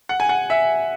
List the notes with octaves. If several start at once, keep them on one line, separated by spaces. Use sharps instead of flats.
F#5
G#5
F#5
E5